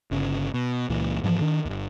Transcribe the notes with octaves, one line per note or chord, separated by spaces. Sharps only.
G1 C#3
B2
C#2 A#2 E3
G#2 E3 F3
D#3 D4
G1 D#2